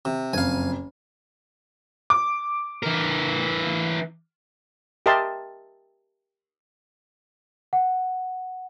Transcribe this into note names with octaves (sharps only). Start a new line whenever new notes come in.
C3
F#1 F2 F5 G#5
D6
E3 A#4
G4 A#4 D#5 E5 A5 C6
F#5